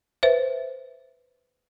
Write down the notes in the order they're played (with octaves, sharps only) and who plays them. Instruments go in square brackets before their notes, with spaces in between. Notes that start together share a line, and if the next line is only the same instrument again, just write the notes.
[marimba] B4 C5 E5